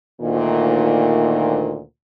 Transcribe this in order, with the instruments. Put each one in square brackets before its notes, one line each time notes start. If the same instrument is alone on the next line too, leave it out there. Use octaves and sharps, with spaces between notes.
[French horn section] D2 A#2 D#3